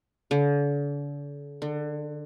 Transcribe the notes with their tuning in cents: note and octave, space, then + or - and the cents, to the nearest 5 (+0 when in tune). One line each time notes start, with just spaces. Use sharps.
D3 -40
D3 +25